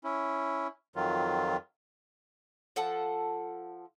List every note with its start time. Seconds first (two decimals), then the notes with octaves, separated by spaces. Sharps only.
0.04 C#4 E4
0.96 F2 D#3 F#3 F4
2.76 F3 A4 F#5 A5